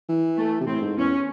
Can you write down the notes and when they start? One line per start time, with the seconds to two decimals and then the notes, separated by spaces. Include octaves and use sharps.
0.09 E3
0.38 A3
0.61 C3
0.67 A2 C4
0.82 G#2
0.97 E2 C#4